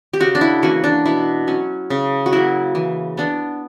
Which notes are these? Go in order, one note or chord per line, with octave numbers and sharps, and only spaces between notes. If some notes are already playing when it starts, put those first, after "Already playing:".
G4
C#3 F#4
D4
E4
E3 A#3 C#4 F#4
D4
B2 E4
F#3 C#4
C#3
F#4
F#3 A#3 E4
E3
B3 D4